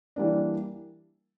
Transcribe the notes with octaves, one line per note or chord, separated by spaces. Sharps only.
E3 G3 A#3 D4